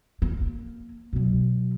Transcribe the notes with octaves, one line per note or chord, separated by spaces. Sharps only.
A#3
B2 F#3